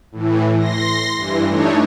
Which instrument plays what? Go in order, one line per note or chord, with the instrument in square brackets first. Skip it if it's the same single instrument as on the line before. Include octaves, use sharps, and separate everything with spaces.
[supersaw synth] A2 E3
C6 A#6
G2 E3
A3 D4 D#4 C#5